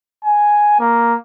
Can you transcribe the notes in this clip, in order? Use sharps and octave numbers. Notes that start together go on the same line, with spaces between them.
G#5
A#3